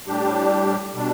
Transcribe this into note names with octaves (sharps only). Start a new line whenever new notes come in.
A2 G3 D4 G4
B2 G3 D4